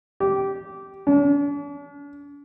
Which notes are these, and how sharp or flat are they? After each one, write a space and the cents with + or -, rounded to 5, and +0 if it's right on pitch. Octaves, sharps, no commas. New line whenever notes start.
G4 -15
D4 -45